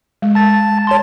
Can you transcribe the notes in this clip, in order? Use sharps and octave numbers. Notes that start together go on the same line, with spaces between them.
G#3
A5 A6
C#5 A5 C6